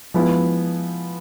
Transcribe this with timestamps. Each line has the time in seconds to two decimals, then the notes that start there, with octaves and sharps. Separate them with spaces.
0.14 F3 G#3 B3 E4